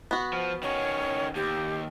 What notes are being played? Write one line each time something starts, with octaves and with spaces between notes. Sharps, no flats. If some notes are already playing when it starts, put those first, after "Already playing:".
B3 F#4
F3
D#3 C#4 C#5
D#2 G4